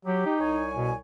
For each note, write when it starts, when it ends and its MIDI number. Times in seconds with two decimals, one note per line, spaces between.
0.05 0.21 54
0.05 0.34 67
0.25 0.69 63
0.39 0.96 36
0.39 0.96 73
0.39 0.96 80
0.76 0.91 47